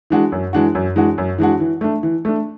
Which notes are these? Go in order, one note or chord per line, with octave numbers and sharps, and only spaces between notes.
E3 G#3 D4 F#4
F#2
E3 G#3 D4 F#4
F#2
E3 G#3 D4 F#4
F#2
E3 G#3 D4 F#4
E3
A3 D4
E3
A3 D4